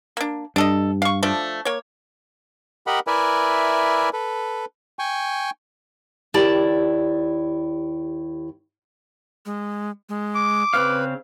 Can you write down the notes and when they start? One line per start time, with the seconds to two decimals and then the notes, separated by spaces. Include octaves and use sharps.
0.17 A#3 D4
0.56 G2 D4 A4 D#5
1.02 F5 C#6
1.23 F3 A3 D4
1.65 A#3 C#5
2.87 G4 A#4 D#5 F#5 B5
3.07 E4 A#4 B4 D5 E5 G#5
4.13 A4 B4
4.99 G5 G#5 C#6
6.34 D#2 E4 G4 D5 A5
9.46 G#3
10.09 G#3
10.35 D6
10.74 C#3 C4 B4 F5